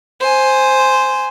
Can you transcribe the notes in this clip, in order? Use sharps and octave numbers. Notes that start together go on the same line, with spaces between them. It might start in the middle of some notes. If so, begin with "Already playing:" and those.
C5 G#5